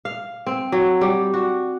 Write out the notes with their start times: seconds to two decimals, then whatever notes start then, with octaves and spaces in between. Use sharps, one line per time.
0.05 F5
0.47 C4
0.72 F#3
1.01 G3
1.34 F#4